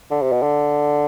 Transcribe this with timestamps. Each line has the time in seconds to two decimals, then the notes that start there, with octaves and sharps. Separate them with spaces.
0.11 D3
0.21 C3
0.32 B2
0.42 D3